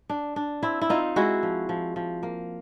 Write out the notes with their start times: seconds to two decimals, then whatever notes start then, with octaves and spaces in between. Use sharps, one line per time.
0.09 D4
0.36 D4
0.63 C4 E4
0.81 E4
0.90 C4 D#4 F4
1.16 G#3 E4 F#4
1.43 F3
1.69 F3
1.96 F3
2.23 A#3